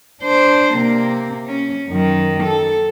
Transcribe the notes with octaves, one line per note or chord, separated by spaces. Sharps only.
D4 C5
C3 A#3
C#4
F#2 D#3
A4